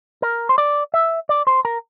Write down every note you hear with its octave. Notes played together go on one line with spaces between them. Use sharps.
A#4
C5
D5
E5
D5
C5
A#4